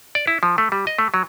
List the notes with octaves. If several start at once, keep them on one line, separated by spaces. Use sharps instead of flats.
D5
E4
F3
A3
G3
D#5
A3
F#3